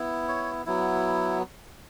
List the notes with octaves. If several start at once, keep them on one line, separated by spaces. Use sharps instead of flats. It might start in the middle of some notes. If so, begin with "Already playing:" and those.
Already playing: B3 E4
C#5
F#3 B3 E4